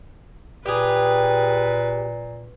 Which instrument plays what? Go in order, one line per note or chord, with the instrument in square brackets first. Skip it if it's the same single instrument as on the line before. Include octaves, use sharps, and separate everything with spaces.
[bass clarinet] A#2 [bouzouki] G4 G#4 [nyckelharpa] B4